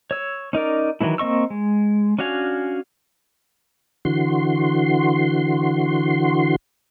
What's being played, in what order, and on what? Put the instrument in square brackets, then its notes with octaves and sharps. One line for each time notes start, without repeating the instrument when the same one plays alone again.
[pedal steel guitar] C#5 E6
C#4 D#4 A#4 D5
D#3 E3 F#3 A3 E4
A#3 C4 D#5 C#6 E6
G#3
C#4 D4 F#4 F5 G#5
[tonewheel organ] D3 E3 F#4 C6